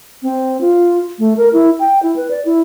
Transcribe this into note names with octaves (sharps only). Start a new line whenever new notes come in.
C4
F4
A3
A#4
E4
G5
E4
B4
D5
E4